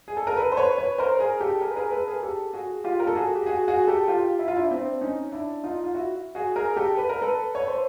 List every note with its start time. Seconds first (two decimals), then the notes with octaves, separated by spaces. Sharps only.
0.08 G#4
0.17 A4
0.27 A#4
0.37 A4 B4
0.52 C5
0.57 B4 C#5
0.78 B4 C#5
0.98 A#4 C5
1.19 G#4 A#4
1.40 G4 A4
1.61 G#4 A#4
1.71 B4
1.76 G#4 A#4
1.91 A4 B4
2.07 G#4 A#4
2.23 G4 A4
2.53 F#4 G#4
2.84 F4 G4
3.00 A#4
3.07 A4
3.15 F#4 G#4
3.35 G4
3.46 F#4 G#4
3.68 F#4 G#4
3.87 G4 A4
4.08 F4 G4
4.39 E4
4.48 F4
4.56 D4 E4
4.70 C4 D4
5.01 C#4 D#4
5.32 D4 E4
5.64 D#4 F4
5.84 F4
5.95 E4 F#4
6.35 F#4 G#4
6.56 G#4 A#4
6.77 G4 A4
6.97 B4
7.09 A#4
7.22 A4 B4
7.55 C#5
7.67 C5